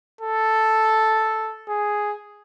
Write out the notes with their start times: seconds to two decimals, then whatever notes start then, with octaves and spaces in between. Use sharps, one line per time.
0.21 A4
1.69 G#4